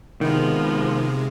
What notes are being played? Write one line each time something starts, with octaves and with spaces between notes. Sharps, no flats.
C3 D#3 F3 G#3 B3